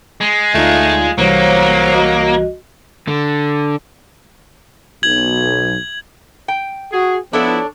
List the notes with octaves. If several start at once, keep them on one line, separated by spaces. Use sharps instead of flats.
G#3
D2 A3 D#4 F4 D5 F5
C2 E3 F#3 G3 A#3 C5 C#5
F#4 D#5
D3
B1 G#6 F#7
G5
F#4 G#4
F3 B3 D4 E4 A4 C#5